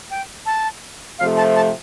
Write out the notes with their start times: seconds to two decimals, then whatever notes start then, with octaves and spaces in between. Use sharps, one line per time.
0.11 G5
0.46 A5
1.19 C3 F3 A3 F5
1.37 A5
1.55 A5